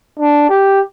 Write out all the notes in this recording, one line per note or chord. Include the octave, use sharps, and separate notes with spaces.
D4
G4